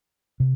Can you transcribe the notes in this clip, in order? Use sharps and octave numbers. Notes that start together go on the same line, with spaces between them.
C3